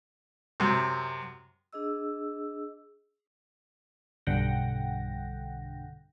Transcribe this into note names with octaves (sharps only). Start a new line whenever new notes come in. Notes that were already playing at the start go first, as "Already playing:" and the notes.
F#2 C3
D4 G#4 D#5 E6
B1 G2 D3 F#5 G5 A#6